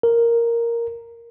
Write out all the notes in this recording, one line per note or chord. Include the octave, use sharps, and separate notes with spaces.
A#4